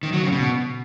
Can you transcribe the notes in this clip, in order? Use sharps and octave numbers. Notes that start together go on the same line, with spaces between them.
D#3
F#3
C#3
B2